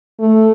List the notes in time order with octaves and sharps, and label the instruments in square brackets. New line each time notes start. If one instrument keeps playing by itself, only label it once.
[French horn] A3